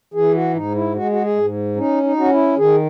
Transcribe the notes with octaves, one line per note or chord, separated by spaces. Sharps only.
E3 G#4
F#4
G#2 D#4
E4
G#3 F#4
F#4
G#4
G#2
C#4 D#4
D#4
C#4 F#4
E4
D#3 G#4